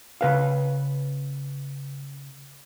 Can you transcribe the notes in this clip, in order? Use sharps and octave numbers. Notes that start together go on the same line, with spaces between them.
C#3 B4 F5